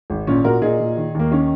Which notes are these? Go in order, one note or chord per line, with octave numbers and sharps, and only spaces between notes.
G#1
A#2 C#4
A#2 F#4 A#4
A#2 D#4 G#4
A#2
D#3
D#2 A#3
D#3 C#4